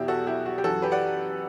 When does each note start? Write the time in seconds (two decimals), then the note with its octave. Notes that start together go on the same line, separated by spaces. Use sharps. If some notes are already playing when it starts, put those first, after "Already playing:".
Already playing: E2 B2 E4 G4
0.08 F#4 A4
0.27 E4 G4
0.46 F#4
0.58 G4
0.64 F#2 E3 F#4 A4
0.82 G4 B4
0.92 D5 F#5